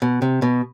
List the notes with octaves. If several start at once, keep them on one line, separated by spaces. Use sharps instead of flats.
B2
C3
B2